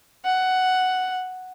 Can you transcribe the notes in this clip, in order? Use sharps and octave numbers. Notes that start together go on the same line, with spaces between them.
F#5